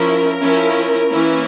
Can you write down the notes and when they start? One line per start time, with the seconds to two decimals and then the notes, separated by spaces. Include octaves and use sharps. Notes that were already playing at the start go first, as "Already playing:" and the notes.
Already playing: F3 C#4 E4 A#4
0.40 F3 C#4 E4
1.10 E3 A#3 C#4 E4